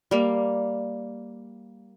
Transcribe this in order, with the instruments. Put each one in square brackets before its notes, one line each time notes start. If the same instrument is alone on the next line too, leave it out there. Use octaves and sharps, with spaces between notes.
[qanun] G3 A#3